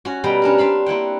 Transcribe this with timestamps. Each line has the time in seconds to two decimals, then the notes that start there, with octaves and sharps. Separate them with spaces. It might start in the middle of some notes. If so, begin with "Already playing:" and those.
0.05 C#4 F#4
0.24 B2 G3 A4 B4 G5 A#5
0.42 C#4 D4 A#4
0.58 C4 D4 F5 B5
0.86 A#3 E4 F#5 G5